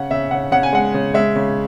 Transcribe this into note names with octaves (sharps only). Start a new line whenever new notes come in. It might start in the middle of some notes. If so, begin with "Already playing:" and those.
Already playing: C#3 F#5
C#3 E5
C#3 F#5
C#3 F#5
G#5
G#3 F#5
C#3
G#3 E5
C#3